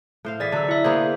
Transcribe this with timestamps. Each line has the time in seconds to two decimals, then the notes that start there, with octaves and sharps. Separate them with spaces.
0.25 A2 C5 F5
0.40 E3 G#4 D5 A6 B6
0.52 D3 F#3 D5 E6
0.68 E4 E5
0.84 A#3 B3 G#4 C5